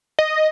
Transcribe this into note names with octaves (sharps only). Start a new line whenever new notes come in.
D#5